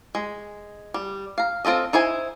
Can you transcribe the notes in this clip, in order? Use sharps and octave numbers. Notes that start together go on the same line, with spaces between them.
G#3
G3
F5 A#5
C4 F4 A4 D#5
D#4 E4 C5 G#5